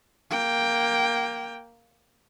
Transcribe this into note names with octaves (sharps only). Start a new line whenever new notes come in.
A#3 G5